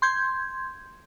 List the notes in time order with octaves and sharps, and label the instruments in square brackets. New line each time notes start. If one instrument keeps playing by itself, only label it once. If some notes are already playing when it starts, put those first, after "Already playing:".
[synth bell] C6 G6 G#6